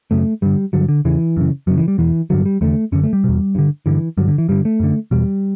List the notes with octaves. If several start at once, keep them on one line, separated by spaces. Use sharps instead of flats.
F#2 C#3 A3
G2 D3 G3
G2 D3 F#3
D3
E2 C#3 E3
F#2 C#3
F#2 C#3 F#3
E3
G3
E2 B2 E3
G2 D3 F#3
G3
E2 D3 A3
F#2 D3 C#4
A3
G3
E2 B2
G2 D3
G2 D3 E3
G2 D3 F#3
D3
E3
G2 D3 G3
A3
F#2 D3
E2 B2 G3